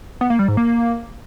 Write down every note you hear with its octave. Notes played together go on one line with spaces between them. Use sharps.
B3
A#3
G3
G#2
A#3